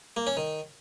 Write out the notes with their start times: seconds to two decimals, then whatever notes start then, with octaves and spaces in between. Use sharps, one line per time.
0.17 A#3
0.27 C#4
0.37 D#3